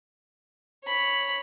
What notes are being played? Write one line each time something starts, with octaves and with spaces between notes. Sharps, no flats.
C#5 B5